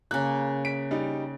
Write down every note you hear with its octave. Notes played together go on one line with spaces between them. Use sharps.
C#3 A#3 F#6
B6 D7
G3 D#4